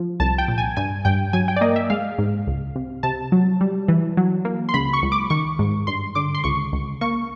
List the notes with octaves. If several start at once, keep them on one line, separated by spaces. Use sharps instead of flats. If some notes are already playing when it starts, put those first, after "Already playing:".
Already playing: F3
C2 A5
G5
A#2
G#5
G2 G#5
G2 G5
F#3 G#5
G5
D5
A#3 D#5
E5
G#3 F5
G#2
C#2
C3
C3 A5
F#3
G3
E3
F#3
A#3
C6
C#2 B5
C#6
C#2
D6
D#3 C#6
G#2
G2 C6
D3 D6
C6
C#2 C#6
C#2
A#3 C#6